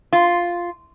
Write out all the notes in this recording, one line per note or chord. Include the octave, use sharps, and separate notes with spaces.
F4